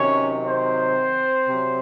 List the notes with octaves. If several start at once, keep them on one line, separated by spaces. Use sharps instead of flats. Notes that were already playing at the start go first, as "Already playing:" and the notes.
Already playing: C3 D#3 F#3 C#4 C#5
C4 C5
C3 F#3